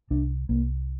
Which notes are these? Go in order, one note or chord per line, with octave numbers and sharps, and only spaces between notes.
C2 D4
C2 A#3